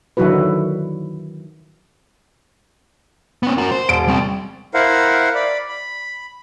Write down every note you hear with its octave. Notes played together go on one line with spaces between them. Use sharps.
D3 D#3 F#3 E4 F#4 B4
B3 C#4
F#4 A#4
C5
E1 D7
G3 C4
E4 A#4 C5 F5 F#5
D5 B5
B5